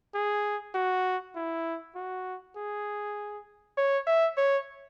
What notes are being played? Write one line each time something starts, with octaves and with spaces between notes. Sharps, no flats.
G#4
F#4
E4
F#4
G#4
C#5
E5
C#5